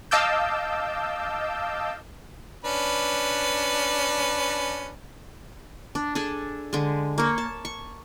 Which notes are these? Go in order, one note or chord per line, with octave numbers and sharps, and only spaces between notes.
D#5 F5 A5 D6 E6 G6
C#4 D4 B4
D4
D4 G#4 A4
D3 G#3
A#3 C#5
A5
C#6